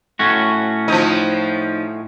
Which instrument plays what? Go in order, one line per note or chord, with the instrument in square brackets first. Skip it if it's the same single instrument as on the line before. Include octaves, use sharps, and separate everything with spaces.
[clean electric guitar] A2 C#4 F#4
[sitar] F3 D#4